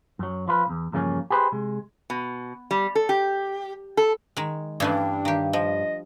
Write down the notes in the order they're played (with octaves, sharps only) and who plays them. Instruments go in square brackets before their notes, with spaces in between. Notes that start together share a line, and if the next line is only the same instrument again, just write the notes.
[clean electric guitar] F#2 F#3
F3 F4 B4
B1 E2
E2 G2 C#3 F3 A#3 C#4
G4 G#4 B4 C5
C3 G#3
[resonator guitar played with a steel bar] B2
G3
A4
G4
A4
[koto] D#3 G#3
[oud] G2 [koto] E3 A3 C#4 [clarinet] D4
[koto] D#3 G4
[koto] F3 [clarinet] D#5